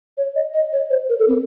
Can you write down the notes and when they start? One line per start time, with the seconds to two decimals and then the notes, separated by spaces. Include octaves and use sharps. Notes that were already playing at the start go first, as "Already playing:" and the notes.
0.17 C#5
0.36 D#5
0.54 D#5
0.73 C#5
0.90 C5
1.09 A#4
1.19 A4
1.28 C4